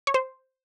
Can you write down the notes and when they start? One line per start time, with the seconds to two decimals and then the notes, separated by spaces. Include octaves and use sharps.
0.07 C#5
0.14 C5